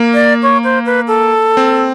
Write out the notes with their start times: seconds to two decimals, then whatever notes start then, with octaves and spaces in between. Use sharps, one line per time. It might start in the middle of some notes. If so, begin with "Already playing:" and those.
Already playing: A#3
0.14 D5
0.42 C#5
0.64 C5
0.85 B4
1.07 A4
1.57 C4